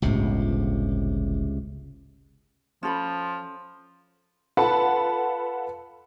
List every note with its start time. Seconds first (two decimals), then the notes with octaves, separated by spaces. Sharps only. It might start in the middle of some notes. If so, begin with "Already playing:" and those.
0.02 G1 C#2 A2 C3
2.83 F3 C#4 A4 B5
4.57 F4 A4 B4 F#5 A5 B5